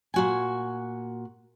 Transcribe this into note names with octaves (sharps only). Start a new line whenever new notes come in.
A#2 F#4 G#5